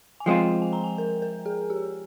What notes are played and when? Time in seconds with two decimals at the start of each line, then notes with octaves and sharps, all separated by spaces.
0.20 G#5
0.26 F3 G#3 C4 F4 G5
0.62 G#5
0.73 A#5
0.84 G#5
0.98 A#4
1.22 A#4
1.46 G#4
1.70 G4